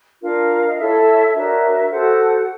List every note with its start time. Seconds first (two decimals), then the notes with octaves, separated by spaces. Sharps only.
0.22 D4 F4 A#4 F5
0.67 D#5
0.78 E4 A4 C#5 E5
1.35 D4 F#4 A#4 C#5 E5
1.91 F#4 A4 C5 F#5